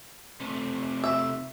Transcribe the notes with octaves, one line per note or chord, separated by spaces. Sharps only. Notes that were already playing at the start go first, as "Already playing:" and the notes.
C3 A3
E5